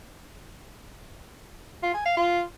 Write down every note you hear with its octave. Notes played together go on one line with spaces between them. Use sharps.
F4
G#5
F5
F4